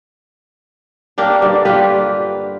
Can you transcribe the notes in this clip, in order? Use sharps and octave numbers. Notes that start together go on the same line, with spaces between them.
A#3 D4 G4 A#4
G2 D3
A#3 F4 G4 B4